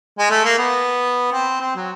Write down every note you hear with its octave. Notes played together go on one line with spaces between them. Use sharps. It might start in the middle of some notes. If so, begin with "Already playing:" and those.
G#3
A3
A#3
B3
C4
C4
F#3